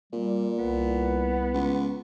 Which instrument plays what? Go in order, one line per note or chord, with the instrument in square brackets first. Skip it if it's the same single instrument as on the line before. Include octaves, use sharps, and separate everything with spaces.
[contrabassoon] A#2 [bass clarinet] G3
[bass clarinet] C2 [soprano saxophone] B3
[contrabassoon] C#2